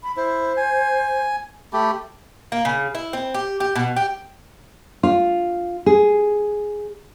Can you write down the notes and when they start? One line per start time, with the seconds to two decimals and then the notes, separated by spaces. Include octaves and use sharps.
0.03 B5
0.17 E4 C5
0.57 G#5
1.73 A3 G4 B5
2.52 A#3
2.65 C#3
2.95 E4
3.13 C4
3.34 G4
3.60 G4
3.75 B2
3.96 G4
5.03 F4
5.86 G#4